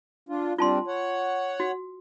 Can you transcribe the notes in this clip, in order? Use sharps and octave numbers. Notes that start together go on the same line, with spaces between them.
D4 F4
G3 C4 D4 F4 A5 C6
C#5 F#5
F#4